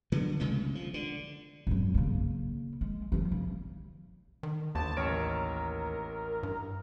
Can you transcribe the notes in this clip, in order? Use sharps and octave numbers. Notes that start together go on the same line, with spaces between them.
D3 F#3 B3
C2 C#3 G#3 A3
F3
D3
G#1 F#2
C#3 A#3
G#3
F3 A3
C#3
D#3
G1 D#2 A5
A1 A#4 C#5 D7
G2